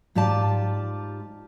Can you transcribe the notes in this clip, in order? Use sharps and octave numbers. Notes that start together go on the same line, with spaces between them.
G#2 F4 G4 D5 A5